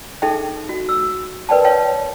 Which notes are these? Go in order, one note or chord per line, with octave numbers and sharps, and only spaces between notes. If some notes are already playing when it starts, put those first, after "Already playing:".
D#4 G#4 A4 E5 G5
F#4
E6
A#4 B4 D5 G5 A5
C#5 F5 G5 A5